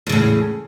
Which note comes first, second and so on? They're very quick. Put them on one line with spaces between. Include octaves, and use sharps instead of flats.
E2 C#3 A2